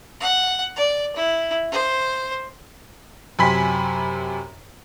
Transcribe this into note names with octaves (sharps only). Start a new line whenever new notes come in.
F#5
D5
E4
C5
F#2 C3 G#5 B5 C6 B6